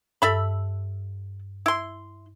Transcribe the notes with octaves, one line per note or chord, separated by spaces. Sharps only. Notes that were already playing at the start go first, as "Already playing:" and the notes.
G2 A4 E5 B5
E4 C6